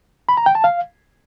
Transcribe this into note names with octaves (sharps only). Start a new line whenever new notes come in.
B5
A#5
G5
A5
F5